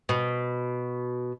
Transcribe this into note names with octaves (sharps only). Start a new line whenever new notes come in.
B2